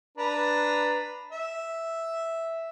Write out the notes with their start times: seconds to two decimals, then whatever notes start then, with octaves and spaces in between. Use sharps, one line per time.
0.18 D4 B4 A#5
1.32 E5